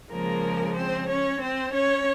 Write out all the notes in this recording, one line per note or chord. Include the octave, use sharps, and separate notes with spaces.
C#3 F3 G#3 A#3 A#4
C4 C5
C#4 C#5
C4 C5
C#4 C#5